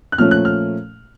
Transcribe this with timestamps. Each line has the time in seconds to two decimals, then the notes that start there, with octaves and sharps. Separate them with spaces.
0.12 F#6
0.18 A#2 F3 A3 C#4 F6
0.31 F#6
0.45 F6